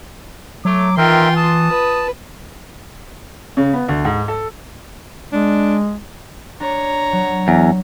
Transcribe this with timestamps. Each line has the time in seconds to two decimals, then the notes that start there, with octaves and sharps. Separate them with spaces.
0.65 F#3 A3 D6
0.97 D#3 E3 F4 A#4 E5 G5 C6
1.37 A5 D#6
1.70 B4
3.57 C#3
3.73 B3
3.88 D2
4.05 G#2
4.28 A4
5.33 G#3 D4
6.60 D4 C#5 A#5
7.12 F#3
7.48 E2